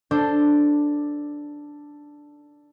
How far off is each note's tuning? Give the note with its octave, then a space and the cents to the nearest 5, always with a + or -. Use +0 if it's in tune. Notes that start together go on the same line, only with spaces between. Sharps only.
D4 +0 A4 +10 C5 +0